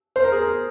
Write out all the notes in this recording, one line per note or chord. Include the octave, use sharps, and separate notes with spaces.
C5
A#4
G#4
A#4